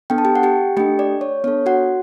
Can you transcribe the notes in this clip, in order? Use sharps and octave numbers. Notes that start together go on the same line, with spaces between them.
B3 D4 A4 G5
A5
G4 G5
F#5
G4 G5
A3 D4 G4 A4 G5
D5
C#5
B3 D4 A4 C#5
F#4 F#5